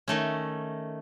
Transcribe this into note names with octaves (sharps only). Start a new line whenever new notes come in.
D#3 A3 C#4